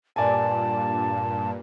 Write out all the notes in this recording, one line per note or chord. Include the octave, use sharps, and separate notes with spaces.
G2 A#2 D5 G#5 A5